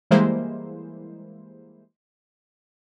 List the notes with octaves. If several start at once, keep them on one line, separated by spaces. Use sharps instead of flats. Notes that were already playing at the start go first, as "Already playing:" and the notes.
E3 G3 G#3 A#3 E4 C5